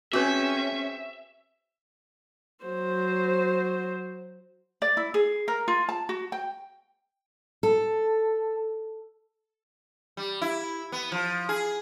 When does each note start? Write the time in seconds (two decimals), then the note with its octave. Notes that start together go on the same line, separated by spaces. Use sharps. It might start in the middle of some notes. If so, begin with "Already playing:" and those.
0.13 C4 C#4 F#4 G#4 B4 E5
2.65 F#3 C5
4.82 D5
4.97 E4
5.14 G#4
5.48 A#4
5.68 F4
5.89 A5
6.09 F#4
6.32 G5
7.63 A4
10.17 G3
10.42 E4
10.92 B3
11.12 F3
11.49 G#4